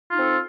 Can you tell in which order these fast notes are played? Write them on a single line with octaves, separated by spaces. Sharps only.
F4 D#4 C4 A4